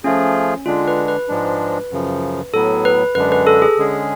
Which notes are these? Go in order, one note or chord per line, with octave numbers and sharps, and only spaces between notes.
F3 A3 C#4 F4 G#4
D3 G#3 D4 F4
B4
B4
G#2 F3 G#3 D4
F#2 C#3 F3
A2 F#3 B3 A4
B4
F#2 D3 G#3 D4 B4
B4
A4
G#4
D3 G#3 C#4 G#4